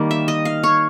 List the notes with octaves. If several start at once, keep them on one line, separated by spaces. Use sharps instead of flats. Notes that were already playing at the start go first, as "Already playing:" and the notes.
Already playing: D#3 G3 A#3
E5
D#5
F5
C#5